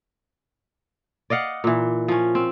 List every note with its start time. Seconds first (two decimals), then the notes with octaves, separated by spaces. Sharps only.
1.30 D5 D#5 F5 F#5
1.64 A#2 E3
2.08 F3 C#4
2.35 C4